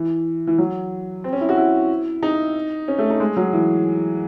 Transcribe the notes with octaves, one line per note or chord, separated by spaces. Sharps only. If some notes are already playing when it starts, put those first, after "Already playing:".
Already playing: E3
E3
F#3
C4
C#4
E4
F#4
E4
D#4
C#4
A3
D#4
G#3
F#3
E3